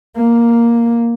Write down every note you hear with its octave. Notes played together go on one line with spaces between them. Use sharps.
A#3